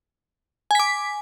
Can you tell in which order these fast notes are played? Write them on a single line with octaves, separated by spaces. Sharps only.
G#5 B6 D6